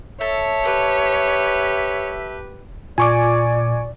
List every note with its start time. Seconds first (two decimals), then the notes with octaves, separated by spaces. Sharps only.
0.21 A4 C#5 E5
0.64 G4 B4
2.98 A#2 D5 G#5 C#6 D6